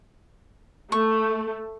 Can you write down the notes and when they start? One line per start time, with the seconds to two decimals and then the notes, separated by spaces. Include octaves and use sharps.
0.92 A3 C#6